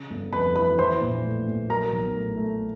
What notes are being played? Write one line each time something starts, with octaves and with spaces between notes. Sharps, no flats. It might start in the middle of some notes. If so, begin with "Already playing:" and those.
Already playing: C#3
G1
F2 B4 B5
E3 B4 B5
E3 C5 C6
A#1
A2
A#1
F#3 A#4 A#5
B1
A2
A3